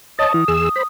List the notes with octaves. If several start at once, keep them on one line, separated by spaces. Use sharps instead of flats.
C#5 D#5 A5 D#6
E3
E2 G#4 E6
C5 B5